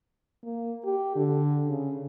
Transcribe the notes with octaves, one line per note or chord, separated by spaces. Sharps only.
A#3
G4
D3
C#3